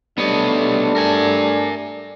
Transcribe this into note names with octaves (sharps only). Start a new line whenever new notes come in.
G3 A3 B3 D4 C#5 D#5
A#4 G#5